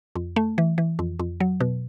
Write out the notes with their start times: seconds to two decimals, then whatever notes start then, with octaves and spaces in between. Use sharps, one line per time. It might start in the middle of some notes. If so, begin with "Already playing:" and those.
0.16 F2
0.36 A3
0.58 E3
0.78 E3
0.99 F2
1.19 F2
1.40 F#3
1.60 B2